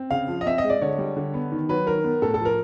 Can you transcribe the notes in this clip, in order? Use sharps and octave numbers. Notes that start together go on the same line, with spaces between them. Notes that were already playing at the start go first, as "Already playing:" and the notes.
Already playing: C4
C#3 F5
F3
D#5
C4 E5
D#5
G#3
D5
D3 C#5
G3
D3
B3
D#3
F#3 B4
D#3 A#4
B3
A2 A4
A4
F3
A#4